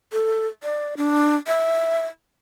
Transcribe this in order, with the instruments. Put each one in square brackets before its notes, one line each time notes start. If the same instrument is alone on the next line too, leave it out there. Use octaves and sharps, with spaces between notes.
[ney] A4
D5
D4
E5